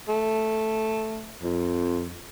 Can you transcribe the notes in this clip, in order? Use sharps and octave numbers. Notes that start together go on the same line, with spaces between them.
A3
F2